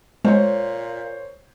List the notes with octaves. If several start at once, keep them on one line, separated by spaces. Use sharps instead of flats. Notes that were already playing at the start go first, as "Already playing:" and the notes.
A#2 G#3 C5 C#5